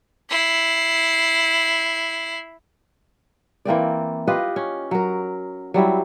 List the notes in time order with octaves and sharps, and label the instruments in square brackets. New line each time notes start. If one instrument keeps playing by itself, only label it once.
[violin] E4 C7
[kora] E3 A#3 C4 D5
F4 G4 B4 D#5
C#4
F#3 A#4
F#3 G3 C4 E4